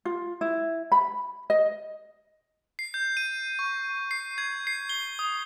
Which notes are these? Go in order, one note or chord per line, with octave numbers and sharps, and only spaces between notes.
F4
E4
B5
D#5
C7
G6
D#7
C#6
C7
G#6
C7
G7
D#6